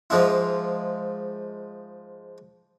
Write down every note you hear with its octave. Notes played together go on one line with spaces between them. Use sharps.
G#2 F3 G#3 E4